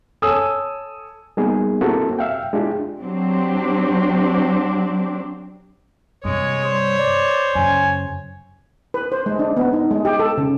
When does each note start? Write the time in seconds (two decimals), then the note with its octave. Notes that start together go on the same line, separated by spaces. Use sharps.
0.22 A4 C#5 G#5 D#6 E6
1.37 G3 A#3 B3 D#4 G#4
1.81 A#3 C4 E4 F#4 G4 A4
2.19 E5 F5 G5
2.53 G#3 D4 E4 F4 G4
3.01 F#3 C4 D4 G4
6.25 G2 C3 G#3 C#5
6.65 G3 C5
6.98 D5
7.55 F#2 C#3 G#5
8.94 B4
9.12 C5
9.26 G#3
9.39 D4
9.57 B3
9.73 D#4
9.91 G#3
10.05 G4
10.19 A4
10.38 C#3